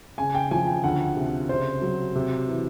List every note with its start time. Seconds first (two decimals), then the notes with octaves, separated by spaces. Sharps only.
0.18 C#3 G#5
0.35 G5
0.51 F3 G#5
0.67 G5
0.84 D2 F#5
1.16 C3
1.49 C#3 C5
1.82 F#3
2.15 C3
2.48 E3